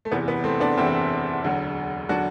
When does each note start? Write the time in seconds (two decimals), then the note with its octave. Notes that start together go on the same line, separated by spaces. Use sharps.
0.05 A3
0.11 F#1 E2 C3 E3 B3
0.28 B3
0.44 A3 C4
0.60 B3 D4
0.77 F#1 E2 C3 E3 C4 E4
1.44 E1 D2 D3 F#3
2.09 D3 F#3 D4 F#4